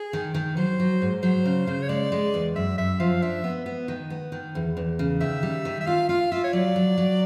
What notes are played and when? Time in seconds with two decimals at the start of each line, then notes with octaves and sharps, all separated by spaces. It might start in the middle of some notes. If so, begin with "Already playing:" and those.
Already playing: G#4
0.13 D#3
0.34 D#3
0.57 F#3 C5
0.80 F#3
1.02 G#2
1.23 F#3 C5
1.45 C#3
1.67 C#3
1.82 C#5
1.89 G#3 D5
2.12 G#3
2.34 E2
2.56 F#2 E5
2.78 F#2 E5
3.00 F3 F5
3.22 D4 E5
3.44 B3
3.66 B3
3.88 D#3
4.10 B3
4.32 D#3
4.55 E2
4.77 E2
4.99 C#3
5.20 D#3 E5
5.43 G3
5.65 D#3
5.81 E5
5.86 F4 F5
6.09 F4 F5
6.32 F4 E5
6.44 C#5
6.53 F#3 D5
6.76 F#3
6.98 F#3